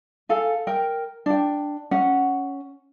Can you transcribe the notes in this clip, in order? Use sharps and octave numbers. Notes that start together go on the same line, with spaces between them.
A4 F5 G#5
A#4 G5
D4 G5
C#4 F#5